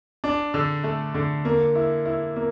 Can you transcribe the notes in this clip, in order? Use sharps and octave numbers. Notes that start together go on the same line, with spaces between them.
D4
D3
A3
D3
A#3
E4
E4
A#3